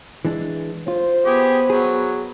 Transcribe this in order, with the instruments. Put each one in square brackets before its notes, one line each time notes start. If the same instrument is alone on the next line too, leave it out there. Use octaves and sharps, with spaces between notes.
[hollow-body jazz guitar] E3 G#3 D4
[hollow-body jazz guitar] F4 [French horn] C5
[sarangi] B3 [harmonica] G4 G#4
[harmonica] F#3 [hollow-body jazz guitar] G#4